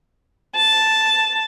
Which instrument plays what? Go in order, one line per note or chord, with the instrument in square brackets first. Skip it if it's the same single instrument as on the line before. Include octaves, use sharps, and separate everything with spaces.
[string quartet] A5